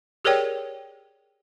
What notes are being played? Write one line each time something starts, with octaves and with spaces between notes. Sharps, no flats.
G4 G#4 A#4 C#5 D5 G5